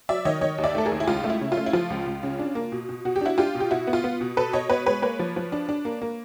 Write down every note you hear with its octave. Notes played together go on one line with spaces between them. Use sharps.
F#3 D5 E5
D#3 C#5 D#5
D#3 C#5 D#5
D#2
D5 E5
A3 A4
G#4 A#4
D#2
E4
C#2 F4
A3
E4
C#3
F4
A3
E4
F3 F4
C#2
C#2
C#3
D4
A#3
B2
B2
B2 F#4
G4
D4 E4 F#4
D4 F4 G4
B2
G4
B2 E4 F#4
B3
F4
B3
B2
B2 A4 B4
B2 C#5 D#5
B3 B4 C#5
G#3 B4 C#5
A#3 B4 C#5
F3
F3
D4
D4
A#3
A#3